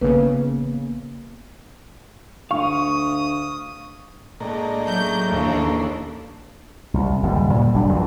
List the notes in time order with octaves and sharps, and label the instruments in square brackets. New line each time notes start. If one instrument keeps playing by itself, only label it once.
[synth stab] A1 C#3 [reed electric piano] A#3 B3 [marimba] B4
[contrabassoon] D2 [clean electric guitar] F5 [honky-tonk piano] C#6 [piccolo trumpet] D#6
[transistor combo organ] A2 A#3 [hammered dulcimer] G#3 D4 G4
[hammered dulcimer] F#2 G#3 E5 [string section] F#3 G6
[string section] D#2 E3 D4 [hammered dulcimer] C#4 A4 F5
[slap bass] C2
F#1 D#2 G#2 G3
A#2 G3
F#1 F#3 G3 D4
A1 D#2 F3